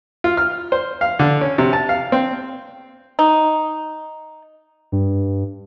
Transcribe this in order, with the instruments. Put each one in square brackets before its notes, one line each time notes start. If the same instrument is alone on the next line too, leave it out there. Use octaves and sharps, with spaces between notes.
[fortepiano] F4
F6
C5
F5
D3
C#4
C3
A5
F5
C4
[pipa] D#4
[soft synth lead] G2